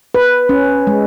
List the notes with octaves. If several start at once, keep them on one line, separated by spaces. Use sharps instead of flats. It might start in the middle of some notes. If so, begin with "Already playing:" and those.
B4
C#4
G#3